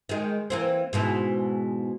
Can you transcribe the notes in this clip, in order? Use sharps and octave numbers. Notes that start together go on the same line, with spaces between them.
D#3 G#3
E3 A#3 C4
G#2 B2 E3